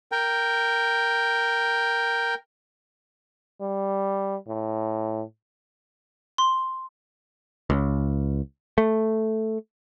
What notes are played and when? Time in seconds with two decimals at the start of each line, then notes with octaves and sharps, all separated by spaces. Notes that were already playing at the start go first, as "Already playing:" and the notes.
0.12 A#4 G5
3.61 G3
4.48 A2
6.38 C6
7.70 C#2
8.78 A3